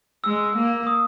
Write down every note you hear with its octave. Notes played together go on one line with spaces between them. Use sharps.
G#3 E6
A#3
D#6